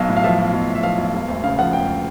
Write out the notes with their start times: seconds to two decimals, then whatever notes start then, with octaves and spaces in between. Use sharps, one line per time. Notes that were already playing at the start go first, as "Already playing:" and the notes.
Already playing: B1 F#3 F5
0.09 A2
0.17 F5
0.24 F3 E5
0.39 B1
0.53 B1
0.69 A2
0.75 E5
0.83 F3 F5
0.98 B1
1.13 E1
1.28 D2
1.44 C#3 F5
1.59 F3 F#5
1.73 E1 G5